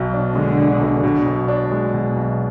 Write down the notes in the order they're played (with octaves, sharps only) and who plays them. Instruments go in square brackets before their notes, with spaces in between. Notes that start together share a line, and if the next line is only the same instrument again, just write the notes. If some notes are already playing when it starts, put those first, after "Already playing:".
Already playing: [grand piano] B1 B2
D4
[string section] D3 [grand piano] G#3
[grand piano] B2
B1
B2
B1
D4
G#3
B2
B1